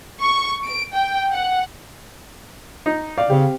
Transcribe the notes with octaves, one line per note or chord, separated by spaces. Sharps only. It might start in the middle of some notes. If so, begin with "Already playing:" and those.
C#6
D7
G5
F#5
D#4
D5 F5
C#3 C4 G4